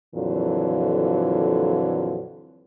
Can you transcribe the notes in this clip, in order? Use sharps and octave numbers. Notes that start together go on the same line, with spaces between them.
F2 A#2 D3 E3 F#3